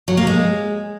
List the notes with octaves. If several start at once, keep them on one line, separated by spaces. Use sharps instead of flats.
F#3
A#3
G#3